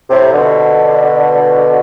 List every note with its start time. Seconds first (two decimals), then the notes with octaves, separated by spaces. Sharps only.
0.10 A2 C3
0.33 B2 D3